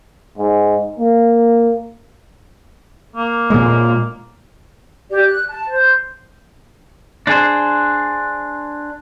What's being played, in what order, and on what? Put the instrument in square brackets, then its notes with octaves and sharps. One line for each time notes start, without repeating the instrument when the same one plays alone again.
[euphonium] G#2
A#3
[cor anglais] A#3
[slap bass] A#2 G#3
[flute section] G4 D5
F#6
A5
C5
[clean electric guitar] D4 G#4 C5